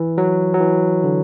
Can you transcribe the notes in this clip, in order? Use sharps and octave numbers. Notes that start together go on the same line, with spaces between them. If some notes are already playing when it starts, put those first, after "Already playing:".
Already playing: E3
F#3
F#3
E3
D3